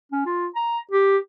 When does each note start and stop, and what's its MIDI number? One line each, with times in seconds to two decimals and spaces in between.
0.12 0.22 61
0.26 0.47 65
0.56 0.79 82
0.91 1.17 67